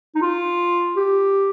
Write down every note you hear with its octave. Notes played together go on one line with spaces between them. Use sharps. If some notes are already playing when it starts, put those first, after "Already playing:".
D#4
F4
G4